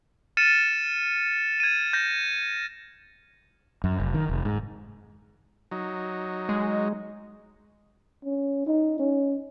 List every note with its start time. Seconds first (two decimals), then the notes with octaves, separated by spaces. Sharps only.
0.37 F6 A6 C#7 D#7 E7
1.60 G#6 D#7
1.93 G6 A#6
3.84 F#2
4.00 F1
4.14 D#3
4.29 F1
4.45 G#2
5.71 F#3 D#4
6.49 G#3
8.25 C#4
8.67 D#4
8.99 C#4